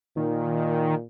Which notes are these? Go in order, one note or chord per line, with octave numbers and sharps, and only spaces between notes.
A#2 D#3